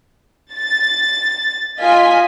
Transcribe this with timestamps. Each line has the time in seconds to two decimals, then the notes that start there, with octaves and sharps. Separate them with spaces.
0.53 A6
1.80 F4 D#5 G#5 B6